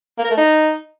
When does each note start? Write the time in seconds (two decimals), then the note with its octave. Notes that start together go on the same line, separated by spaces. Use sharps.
0.18 A#3
0.25 A#4
0.31 A3
0.37 D#4